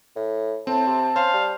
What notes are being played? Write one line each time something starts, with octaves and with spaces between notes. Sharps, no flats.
A2
A2 C4 A5
C3
C#4 C5 F5
G3